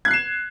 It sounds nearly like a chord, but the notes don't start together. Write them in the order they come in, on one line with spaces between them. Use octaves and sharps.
G#6 F#6 C7 E7